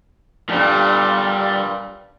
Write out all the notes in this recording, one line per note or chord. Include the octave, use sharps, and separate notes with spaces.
G2 A#2 D3 G3